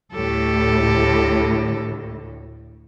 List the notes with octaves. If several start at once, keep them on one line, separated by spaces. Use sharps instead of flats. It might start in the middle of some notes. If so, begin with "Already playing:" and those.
D2 A2 G4 A4